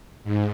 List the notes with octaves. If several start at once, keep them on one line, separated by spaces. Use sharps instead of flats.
G#2